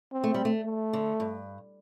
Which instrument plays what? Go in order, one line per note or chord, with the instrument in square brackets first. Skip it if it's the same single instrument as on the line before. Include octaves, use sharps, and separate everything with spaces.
[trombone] C4
[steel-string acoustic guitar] A3
G3
A3
[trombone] A3
[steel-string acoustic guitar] D3
G2